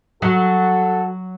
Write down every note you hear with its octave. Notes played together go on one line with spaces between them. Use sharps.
F#3 F#4 A4